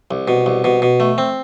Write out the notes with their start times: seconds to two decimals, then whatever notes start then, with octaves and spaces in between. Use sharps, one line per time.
0.11 C2
0.28 B2
0.46 C2
0.64 B2
0.82 B2
1.00 A3
1.18 C4